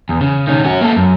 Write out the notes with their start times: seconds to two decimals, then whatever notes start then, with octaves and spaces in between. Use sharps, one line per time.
0.09 E2
0.21 C#3
0.47 D#3 C#4
0.64 C#4 F#4
0.81 A#3 A4
0.96 F#2